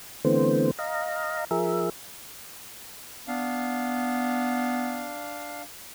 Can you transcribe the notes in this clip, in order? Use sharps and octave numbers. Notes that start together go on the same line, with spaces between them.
D3 E3 A3 B3 C4 C5
D#5 F5 A#5
F3 G#4 A#4 E5
B3 D4 F5